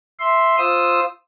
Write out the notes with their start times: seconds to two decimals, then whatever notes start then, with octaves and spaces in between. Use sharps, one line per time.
0.19 E5 C6
0.58 F4 C5 D#6 E6